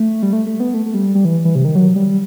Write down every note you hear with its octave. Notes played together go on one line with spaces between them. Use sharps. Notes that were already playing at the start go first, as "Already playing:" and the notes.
Already playing: A3
G3
A3
A3
B3
A3
A3
G3
G3
E3
E3
C3
D#3
F#3
G3